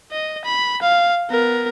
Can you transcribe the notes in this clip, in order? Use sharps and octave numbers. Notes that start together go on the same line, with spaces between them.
D#5
B5
F5
B3 A#4